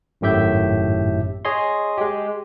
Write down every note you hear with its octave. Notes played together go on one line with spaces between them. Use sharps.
G#1 F#2 A2 G4 E5 G6
G#4 C#5 D#5 C6
G#3 G4